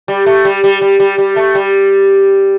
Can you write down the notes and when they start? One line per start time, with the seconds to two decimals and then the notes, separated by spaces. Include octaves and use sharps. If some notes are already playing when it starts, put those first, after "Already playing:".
0.08 G3
0.26 A3
0.45 G3
0.64 G3
0.81 G3
1.00 G3
1.18 G3
1.36 A3
1.55 G3